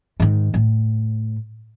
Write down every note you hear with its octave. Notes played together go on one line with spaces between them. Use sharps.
G#2 D#3
A2